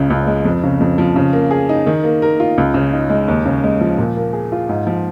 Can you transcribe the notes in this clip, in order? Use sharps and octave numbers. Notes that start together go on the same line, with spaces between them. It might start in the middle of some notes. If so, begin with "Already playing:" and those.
Already playing: C#2 C#3
C#2
G#3
F2
C#3
F2
F3
C#3
A#3
G#4
D#4
D#3
A#3
A#4
F4
C#2
C#3
D#4
G#3
D#2
C#3
G#3
F3
A#2
A#3
G#4
F4
G#2
F3